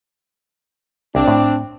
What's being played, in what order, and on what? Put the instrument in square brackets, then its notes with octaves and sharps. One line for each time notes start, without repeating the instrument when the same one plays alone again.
[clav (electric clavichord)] C2 [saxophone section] C4 D4
[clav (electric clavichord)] A2